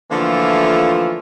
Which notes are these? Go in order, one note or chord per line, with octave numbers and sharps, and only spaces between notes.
D3 E3 F3 A3 A#3 F4